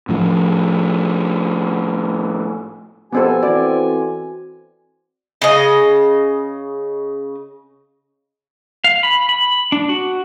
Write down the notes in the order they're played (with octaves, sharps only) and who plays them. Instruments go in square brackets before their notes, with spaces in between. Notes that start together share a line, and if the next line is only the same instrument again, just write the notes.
[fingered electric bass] A2 F3
[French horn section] F2 B2 G4 [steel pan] B3 C4 A4 [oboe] G#5
[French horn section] E3 C4 A4 [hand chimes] F#4 [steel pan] D5
[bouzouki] C#3 D#5
[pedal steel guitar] F5
B5
B5
D4
F#4